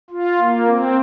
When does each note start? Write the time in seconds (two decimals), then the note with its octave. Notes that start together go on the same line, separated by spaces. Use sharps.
0.10 F4
0.40 A#3
0.67 C4